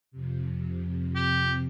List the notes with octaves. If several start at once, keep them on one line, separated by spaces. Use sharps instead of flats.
F2 C3
G4